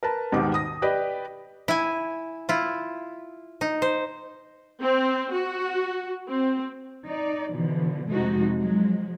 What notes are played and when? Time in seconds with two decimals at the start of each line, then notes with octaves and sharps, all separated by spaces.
0.03 A#4 B4 A5
0.32 D#1 G#2 B2 D#3 G4 D6
0.54 D#6 A#6
0.82 G4 B4 D5 D#5
1.68 E4 G#5
2.49 E4 F4
3.61 D#4
3.82 C5
4.81 C4
5.33 F#4
6.29 C4
7.06 D#4 D5
7.52 B2 D3 E3 F3
8.10 F2 C3 G#3 A3 D#4 F#4
8.59 F3 F#3 G#3